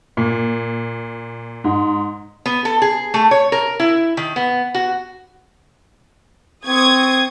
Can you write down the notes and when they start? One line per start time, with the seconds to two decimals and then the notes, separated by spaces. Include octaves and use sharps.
0.17 A#2
1.64 G#2
2.46 B3
2.65 A4
2.82 G#4
3.14 A3
3.31 C#5
3.52 A#4
3.80 E4
4.17 D#3
4.36 B3
4.75 F#4
6.67 C4 C#6 D#6 G#6